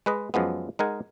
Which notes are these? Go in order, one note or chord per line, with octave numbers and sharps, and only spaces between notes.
G#3 B4 D#5
F#2 F3 G#3 B3
G#3 D#4 A#4 F#5 G#5